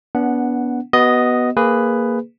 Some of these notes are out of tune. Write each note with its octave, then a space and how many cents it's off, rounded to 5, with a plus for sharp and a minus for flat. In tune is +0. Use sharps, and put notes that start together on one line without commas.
B3 -15 D4 -40 F#5 +0
B3 +0 F#4 +35 D#5 +0
A#3 -5 G#4 -5 B4 +10